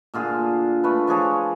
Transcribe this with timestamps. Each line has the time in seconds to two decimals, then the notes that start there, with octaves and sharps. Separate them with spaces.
0.14 A#2 D3 F4 G#4
0.84 A3 B4
1.07 F3 D4 G#4 C#5